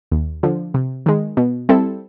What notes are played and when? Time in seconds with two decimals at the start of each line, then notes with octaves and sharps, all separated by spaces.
0.12 D#2
0.43 D3 F3
0.74 C3
1.06 D#3 G#3
1.37 B2
1.69 G3 C4 E4 A4